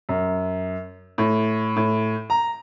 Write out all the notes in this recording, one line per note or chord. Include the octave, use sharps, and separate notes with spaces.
F#2
A2
A2
A#5